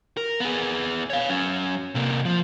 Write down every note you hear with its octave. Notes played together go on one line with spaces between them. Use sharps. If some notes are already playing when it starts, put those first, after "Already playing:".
A#4
B3 G#4
C#5 F5
F#3 C#4
C3 A#3
F3